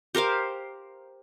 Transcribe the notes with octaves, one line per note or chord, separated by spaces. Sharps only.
G4 A#4 C5 F5